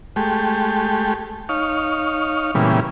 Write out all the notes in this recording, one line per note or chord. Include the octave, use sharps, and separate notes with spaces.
G#3 A3 G4
D#4 C#5 F5
A#2 C#3 E3 G3 G#3 B3